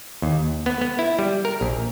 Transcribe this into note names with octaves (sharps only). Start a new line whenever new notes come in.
D#2
B3
B3
E4
G3
A#4
A#1